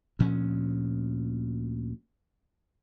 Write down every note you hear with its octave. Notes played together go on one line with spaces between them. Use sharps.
D2 A#2 F3 C#4